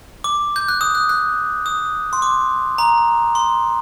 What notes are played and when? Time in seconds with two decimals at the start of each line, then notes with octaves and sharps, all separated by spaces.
0.24 D6
0.56 G6
0.68 F#6
0.81 D#6
0.95 F#6
1.09 F#6
1.66 D#6
2.13 C6
2.22 D6
2.78 A#5
3.35 C6